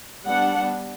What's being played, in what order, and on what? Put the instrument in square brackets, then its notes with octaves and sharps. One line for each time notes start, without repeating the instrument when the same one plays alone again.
[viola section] G3 B3 D4 F#5